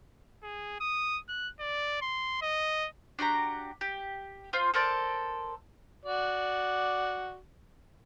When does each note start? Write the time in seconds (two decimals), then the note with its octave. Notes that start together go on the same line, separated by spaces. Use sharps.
0.43 G#4
0.80 D#6
1.29 F#6
1.60 D5
2.02 C6
2.42 D#5
3.19 D4 F#4 G4 A#5
3.81 G4
4.53 F4 C5
4.74 A4 A#4 C5 D5
6.05 F#4 D5